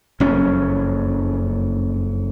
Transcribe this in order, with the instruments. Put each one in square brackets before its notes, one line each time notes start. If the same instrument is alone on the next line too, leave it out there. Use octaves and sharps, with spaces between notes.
[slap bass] F#1 F2 C#4